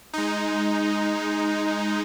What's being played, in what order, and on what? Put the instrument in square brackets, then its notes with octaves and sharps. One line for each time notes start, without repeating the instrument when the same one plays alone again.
[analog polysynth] G#3 D#4